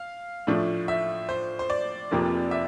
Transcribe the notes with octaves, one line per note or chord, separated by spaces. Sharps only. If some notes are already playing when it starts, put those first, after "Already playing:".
Already playing: F5
A2 F3 A3 D4
E5
C5
C5
D5
F1 F2 C3 F3 A#3
E5